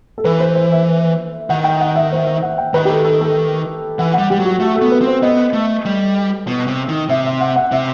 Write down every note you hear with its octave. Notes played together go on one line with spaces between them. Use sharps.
A4
E3 B4
C5
C5
E5
D#3 F#5
G5
F#5
E5
C5
E5
F#5
G5
D#3 B4
G4
A4
A4
A4
E3 F#5
F#5
G3
G3 G4
F#3 F#4
A3 F#4
A4
B3
B4
C4
C5
B3 D#5
A3
G3
B2
C3
D#3
C3 E5
E5
F#5
F#5
C3 E5